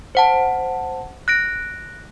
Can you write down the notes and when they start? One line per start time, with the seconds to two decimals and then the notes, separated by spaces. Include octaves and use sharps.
0.15 C5 F#5 A5
1.28 F#6 A#6 D7